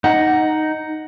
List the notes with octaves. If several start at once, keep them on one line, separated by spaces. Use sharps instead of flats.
D#4 F#5